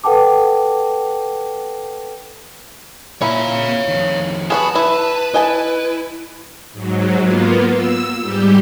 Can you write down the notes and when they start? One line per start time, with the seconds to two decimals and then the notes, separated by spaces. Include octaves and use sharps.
0.04 A4 B4 F#5 G5 A5 D6
3.22 A#2 E4 C#5 F5 A#5
3.88 F2 D#3
4.50 B1 B3 F#4 G#4 A5 B5
4.75 E4 B4
5.34 E4 D#5 G#5 A5
6.73 G#2 F#3
7.21 A#3 B3 F4
7.71 E6
8.22 G#2 G3 G4